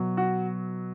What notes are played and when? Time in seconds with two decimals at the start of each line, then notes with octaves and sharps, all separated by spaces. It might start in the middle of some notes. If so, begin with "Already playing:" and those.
Already playing: B2 F#3
0.17 F#4